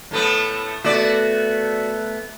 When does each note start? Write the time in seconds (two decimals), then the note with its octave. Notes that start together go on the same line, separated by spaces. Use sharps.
0.11 A2 A3 B3
0.85 A3 B3 F#4 D5